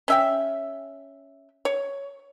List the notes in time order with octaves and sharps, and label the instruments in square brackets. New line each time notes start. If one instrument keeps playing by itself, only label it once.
[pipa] C#4 E5 G5
C#5